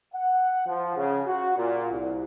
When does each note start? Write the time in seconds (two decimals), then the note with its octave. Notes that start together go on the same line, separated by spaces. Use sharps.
0.14 F#5
0.67 F3
0.96 C#3
1.26 F#4
1.57 A#2
1.91 C2